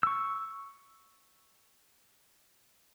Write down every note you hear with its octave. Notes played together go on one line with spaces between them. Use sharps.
C#6 E6